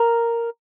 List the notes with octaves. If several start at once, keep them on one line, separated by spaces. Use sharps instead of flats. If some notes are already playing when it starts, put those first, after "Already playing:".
Already playing: A#4